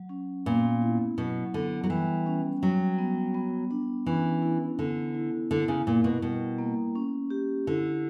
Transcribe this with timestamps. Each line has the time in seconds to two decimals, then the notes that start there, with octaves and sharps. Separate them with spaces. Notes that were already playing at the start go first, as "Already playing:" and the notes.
Already playing: F#3
0.09 C#4
0.46 A#2 B3
0.82 E4
1.18 B2 F#3
1.54 D3 B3
1.84 F#3
1.90 E3 G3
2.26 C#4
2.63 F#3 G3
2.99 B3
3.34 B3
3.71 D4
4.06 E3 C#4
4.42 E4
4.79 D3 B3
5.15 E4
5.51 D3 E4
5.68 C#3
5.87 A#2 A#4
6.04 B2
6.22 B2 G3
6.58 A#3
6.95 C#4
7.30 G4
7.67 D3 E4